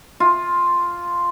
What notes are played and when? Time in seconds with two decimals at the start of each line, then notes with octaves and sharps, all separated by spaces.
0.20 F4